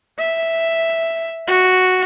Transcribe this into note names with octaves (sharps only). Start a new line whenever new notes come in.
E5
F#4